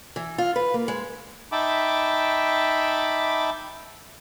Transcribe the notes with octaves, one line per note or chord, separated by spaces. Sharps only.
E3
F4
B4
A#3
G#3
D#4 E5 G5 A5 B5 D6